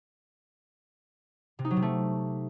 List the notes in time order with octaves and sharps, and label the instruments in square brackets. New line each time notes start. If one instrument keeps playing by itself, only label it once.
[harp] C3
D#4
F#3
C3
A3